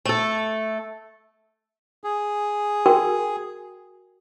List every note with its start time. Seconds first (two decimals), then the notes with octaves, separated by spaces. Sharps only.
0.05 A3 A4
2.04 G#4
2.86 F#4 A#4 G5